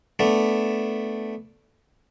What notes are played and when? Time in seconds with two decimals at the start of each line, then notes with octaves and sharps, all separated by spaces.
0.19 A3 B3 D4